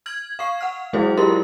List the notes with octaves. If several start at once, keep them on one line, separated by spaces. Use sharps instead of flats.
F6 G#6 F#7
F5 C#6 C7
F#5 F6
F#3 G#3 E4 F#4 G#4 C5
E4 F4 G4 A#4 C6